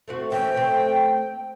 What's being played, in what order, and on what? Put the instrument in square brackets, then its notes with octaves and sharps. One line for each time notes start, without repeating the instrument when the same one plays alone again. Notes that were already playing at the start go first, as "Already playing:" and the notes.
[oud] A3 C4 F#4
[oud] E3 C4 C#4 [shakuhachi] G5
[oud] A3 C4